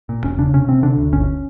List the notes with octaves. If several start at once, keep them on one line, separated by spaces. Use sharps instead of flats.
A#2
E1 C#4
C#3 D4
C3 C#4
C3 C4
D3 D4
D2
G1 C#4